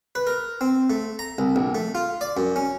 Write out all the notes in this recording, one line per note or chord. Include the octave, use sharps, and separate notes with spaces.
B4
A#4
C4
A3
A#5
C2
A#1
A3
F4
D5
F#2
C#4